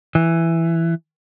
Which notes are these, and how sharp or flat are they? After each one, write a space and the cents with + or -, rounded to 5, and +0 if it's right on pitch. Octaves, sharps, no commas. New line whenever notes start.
E3 +10